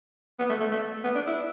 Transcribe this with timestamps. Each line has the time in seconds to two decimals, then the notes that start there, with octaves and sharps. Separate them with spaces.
0.39 B3
0.50 A3
0.60 A3
0.71 A3
1.04 B3
1.16 D4
1.27 E4